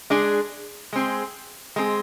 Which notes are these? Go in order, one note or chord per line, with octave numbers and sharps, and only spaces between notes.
G#3 D4 G#4
G#3 C4 G#4
G#3 C4 G#4